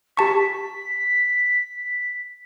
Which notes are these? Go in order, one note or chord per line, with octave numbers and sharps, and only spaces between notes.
G4 A5 C#6 B6